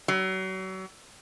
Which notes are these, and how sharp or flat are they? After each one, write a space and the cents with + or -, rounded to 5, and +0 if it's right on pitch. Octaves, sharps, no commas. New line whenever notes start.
F#3 +35